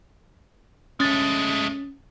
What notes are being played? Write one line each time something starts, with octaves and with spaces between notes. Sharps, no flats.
G#3 A3 C#4 A6